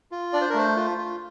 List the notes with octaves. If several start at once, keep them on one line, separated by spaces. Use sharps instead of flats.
F4
D4 D5
C5
A#4
A3 C5
F4
F4